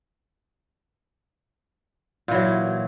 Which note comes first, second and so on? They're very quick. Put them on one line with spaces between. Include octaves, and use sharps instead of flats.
A#2 E3 F#3